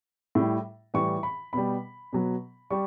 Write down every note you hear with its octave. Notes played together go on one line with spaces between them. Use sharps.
A2 G3
A2 E3 G3 C#6
B5
B2 G3 B5
B2 F#3
G3 C#6